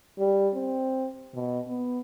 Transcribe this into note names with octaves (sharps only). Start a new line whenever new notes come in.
G3
C4
B2
B3